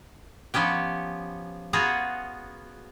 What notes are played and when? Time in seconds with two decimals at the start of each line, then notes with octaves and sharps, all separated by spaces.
0.54 F3 B3 C#4 G4
1.73 B3 F4 F#4 G#4 A#5